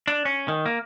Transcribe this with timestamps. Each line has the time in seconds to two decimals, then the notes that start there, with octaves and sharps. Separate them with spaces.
0.08 D4
0.25 C#4
0.48 D#3
0.66 A#3